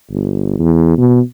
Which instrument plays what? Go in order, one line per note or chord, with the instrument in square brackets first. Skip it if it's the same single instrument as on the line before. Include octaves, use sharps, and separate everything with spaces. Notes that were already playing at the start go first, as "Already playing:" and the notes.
[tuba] G1
E2
B2